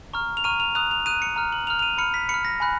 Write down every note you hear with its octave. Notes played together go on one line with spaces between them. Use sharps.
A#5 C#6 F6
F7
A#5 C#6 F6 D#7
F7
A#5 D#6 F#6 F7
F7
A#5 D#6 F#6 D#7
C#7
A#5 F6
F#7
A#5 F6 F7
F7
D#7
B5 F6 C#7
B6
B5 C#7
F6
A#6
G#5 B5 F#6